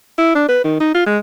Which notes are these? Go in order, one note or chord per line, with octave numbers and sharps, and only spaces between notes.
E4
D4
B4
D#3
D#4
F4
G#3